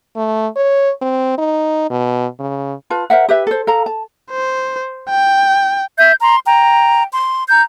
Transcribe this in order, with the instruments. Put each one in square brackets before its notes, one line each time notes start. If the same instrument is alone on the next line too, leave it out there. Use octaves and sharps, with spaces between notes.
[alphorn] A3
C#5
C4
D#4
B2
C#3
[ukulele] F4 B4 A5
A#4 C5 E5 F#5
G4 B4 E5
A4 C5
A4 F5 A#5
A5
[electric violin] C5
G5
[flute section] E5 G6
A#5 C6
G5 A#5
C6
A#5 G6